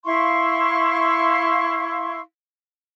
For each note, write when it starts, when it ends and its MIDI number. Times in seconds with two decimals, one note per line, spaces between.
0.04 2.19 64
0.04 2.19 77
0.04 2.19 84
0.04 2.19 85